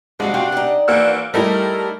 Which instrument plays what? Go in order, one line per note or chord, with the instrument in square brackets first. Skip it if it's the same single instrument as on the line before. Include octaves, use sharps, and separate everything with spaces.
[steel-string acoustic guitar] F2 F#4 F5 [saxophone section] C3 D4 F#5 [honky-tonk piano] G#3
[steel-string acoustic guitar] F4 F#4 F5 [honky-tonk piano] G5
[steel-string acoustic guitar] D#4 D5
[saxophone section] E3 F#4 C5 [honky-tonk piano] A#3 F#5 E6
[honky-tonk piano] G3 A3 E4 [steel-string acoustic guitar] D#4 G4 D#5 [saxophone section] A#4